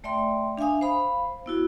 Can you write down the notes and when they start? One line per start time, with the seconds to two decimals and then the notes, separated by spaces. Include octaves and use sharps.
0.04 A3 D5 E5 G5 C6
0.58 D4 E5 F5 G#5 D#6
0.81 C5 F5 B5
1.46 B3 E4 F#4